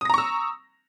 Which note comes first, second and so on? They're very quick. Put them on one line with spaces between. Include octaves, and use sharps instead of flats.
D#6 A#6 A#5 C#6 E6